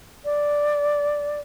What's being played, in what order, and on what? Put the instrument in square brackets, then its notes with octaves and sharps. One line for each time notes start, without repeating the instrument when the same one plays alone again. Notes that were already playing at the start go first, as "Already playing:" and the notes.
[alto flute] D5